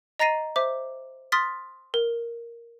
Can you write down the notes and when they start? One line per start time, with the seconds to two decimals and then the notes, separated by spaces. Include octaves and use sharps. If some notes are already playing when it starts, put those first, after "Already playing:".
0.19 D#5 A#5 A6 A#6 C7 D#7
0.56 C5 E5 D6
1.32 C6 D#6 F6 A6 B6
1.94 A#4